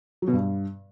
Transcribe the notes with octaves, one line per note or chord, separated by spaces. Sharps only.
F#3
B2
G2